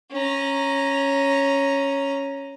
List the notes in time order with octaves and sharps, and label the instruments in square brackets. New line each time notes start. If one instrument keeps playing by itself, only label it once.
[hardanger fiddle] C#4 A#5